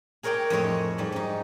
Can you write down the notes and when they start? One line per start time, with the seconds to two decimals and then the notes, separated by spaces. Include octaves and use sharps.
0.23 G#4 A#4 C#5 D5 G5
0.50 F2 A2 G#4 C#5 D#5
0.98 G#2 G3
1.12 C#4 D#4